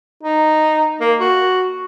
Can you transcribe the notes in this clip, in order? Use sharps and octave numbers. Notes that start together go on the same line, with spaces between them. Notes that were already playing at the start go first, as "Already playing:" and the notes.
D#4
A#3
F#4